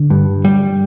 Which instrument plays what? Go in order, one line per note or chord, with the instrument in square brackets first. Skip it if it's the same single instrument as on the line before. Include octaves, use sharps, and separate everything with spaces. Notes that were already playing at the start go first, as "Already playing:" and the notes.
Already playing: [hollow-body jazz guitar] D3
G2
G3